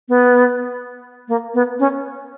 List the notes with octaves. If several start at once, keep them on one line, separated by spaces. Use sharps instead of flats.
B3
A#3
B3
C#4